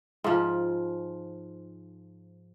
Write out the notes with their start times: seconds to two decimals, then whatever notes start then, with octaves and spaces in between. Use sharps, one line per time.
0.24 G#2 F3